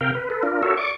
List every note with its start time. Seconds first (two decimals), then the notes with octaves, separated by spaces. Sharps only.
0.01 C3 A#4 F5 G5
0.15 B4
0.30 A4 B4
0.43 D4 F4 A#4
0.63 F#4 A4 A#4 C#5 E5
0.77 D5 C#6 D6